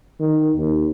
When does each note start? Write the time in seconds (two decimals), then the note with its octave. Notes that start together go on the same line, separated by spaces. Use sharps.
0.20 D#3
0.56 D#2